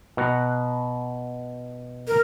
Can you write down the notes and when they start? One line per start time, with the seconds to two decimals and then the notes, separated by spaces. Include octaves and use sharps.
0.17 B2 F#5 A#5
2.08 A#4